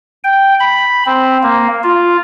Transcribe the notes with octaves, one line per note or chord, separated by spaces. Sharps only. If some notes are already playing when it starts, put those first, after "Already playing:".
G5
B5
C4
A#3
F4